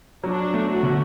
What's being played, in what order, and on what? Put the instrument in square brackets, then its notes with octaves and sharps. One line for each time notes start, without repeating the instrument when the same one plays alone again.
[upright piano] F#3 [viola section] D4
[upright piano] A3
[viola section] F#4
[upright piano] D3